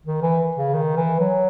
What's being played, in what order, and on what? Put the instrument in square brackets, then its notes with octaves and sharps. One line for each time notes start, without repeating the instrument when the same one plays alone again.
[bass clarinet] D#3
E3
C#3
D#3
E3
F#3